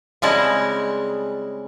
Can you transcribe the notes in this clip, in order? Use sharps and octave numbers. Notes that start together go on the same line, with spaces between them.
C#3 G3 G#3 C4 E4 A5